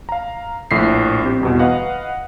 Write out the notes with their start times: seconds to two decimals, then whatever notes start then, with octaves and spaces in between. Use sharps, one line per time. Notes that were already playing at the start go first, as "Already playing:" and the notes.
0.09 F5 A#5
0.71 A#1 A2 B6 C7
1.23 C4 G4
1.41 G1 E2 B2
1.59 B4 D#5 F5 F#5